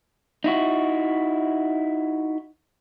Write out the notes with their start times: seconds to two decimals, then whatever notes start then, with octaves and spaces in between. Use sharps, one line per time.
0.44 D#4 E4 F#4